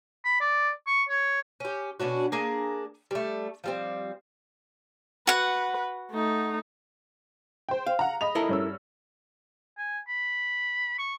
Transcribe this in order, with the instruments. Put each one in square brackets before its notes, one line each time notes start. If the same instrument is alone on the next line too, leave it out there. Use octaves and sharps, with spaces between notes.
[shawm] B5
D5
C#6
C#5
[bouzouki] C#4 G4
B2 C#4 D4 F#4
A#3 D4 G#4 A#4
G3 A3
F3 G3 C4
[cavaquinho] F#4 F#5 [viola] B4
[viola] A3 D#4
[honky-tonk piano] C5 G5
[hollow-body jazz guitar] F5
[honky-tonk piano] F#5 A#5
D#5 B5 F7
[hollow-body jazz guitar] E4 A4 A#4
[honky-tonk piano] G2 C#4 E6
[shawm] G#5
B5
C#6